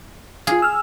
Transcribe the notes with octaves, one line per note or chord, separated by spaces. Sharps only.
F4 G#4 F5
E6 F6